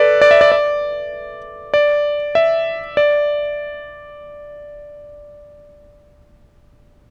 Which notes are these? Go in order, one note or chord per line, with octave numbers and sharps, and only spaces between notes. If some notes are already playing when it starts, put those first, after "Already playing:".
Already playing: A4 B4 D5
D5
E5
D5
D5
D5
E5
D5